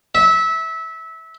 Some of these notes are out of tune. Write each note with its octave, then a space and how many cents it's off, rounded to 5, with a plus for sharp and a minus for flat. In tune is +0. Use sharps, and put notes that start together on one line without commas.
E5 -20